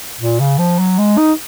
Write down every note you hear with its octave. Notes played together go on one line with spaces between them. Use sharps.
A#2
C#3
F3
F#3
G#3
D#4